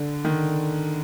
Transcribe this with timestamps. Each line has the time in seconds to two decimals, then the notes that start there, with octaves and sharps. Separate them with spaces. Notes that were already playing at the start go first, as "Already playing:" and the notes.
Already playing: D3
0.25 D#3